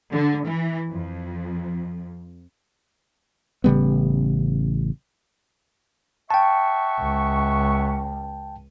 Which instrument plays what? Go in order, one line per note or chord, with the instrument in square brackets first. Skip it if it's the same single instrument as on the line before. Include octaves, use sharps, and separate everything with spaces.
[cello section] D3
E3
F2
[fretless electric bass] A1 C#3 G3 B3
[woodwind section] E5 F#5 C#6 [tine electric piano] G5 A5
[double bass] C#2